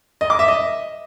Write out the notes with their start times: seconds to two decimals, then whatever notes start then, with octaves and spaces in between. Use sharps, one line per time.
0.21 D#5
0.30 D6
0.39 E5
0.48 D#5